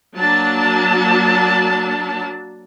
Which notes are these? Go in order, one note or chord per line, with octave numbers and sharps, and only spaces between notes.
F#3 A#3 D4 A5